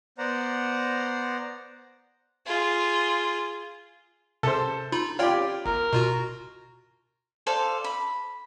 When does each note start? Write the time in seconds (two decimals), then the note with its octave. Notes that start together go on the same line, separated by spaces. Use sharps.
0.18 B3 C5 D5 F#5 A#5
2.46 F4 G#4
4.43 C3 A4 C5
4.92 D#4 F4 B5
5.19 F4 G4 C#5 D5 G5
5.66 G1 A#4
5.93 B2 F4 F#4
7.47 A4 C5 D5 F5
7.84 B5